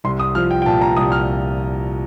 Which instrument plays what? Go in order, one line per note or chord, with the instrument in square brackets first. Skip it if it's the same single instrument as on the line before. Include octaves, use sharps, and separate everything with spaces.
[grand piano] C2 C6
D#6
F3 F6
G5
G5
A#2 A5
A#5
C2 D#6
F6